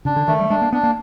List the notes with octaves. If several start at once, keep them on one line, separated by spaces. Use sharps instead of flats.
C#3 D4
D3
D#3 A3
G3
G#3 D4
A#3
B3 D4
A#3